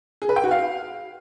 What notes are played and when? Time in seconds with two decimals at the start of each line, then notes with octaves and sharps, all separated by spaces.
0.22 G#4
0.29 B4
0.36 G5
0.44 F#4
0.51 F5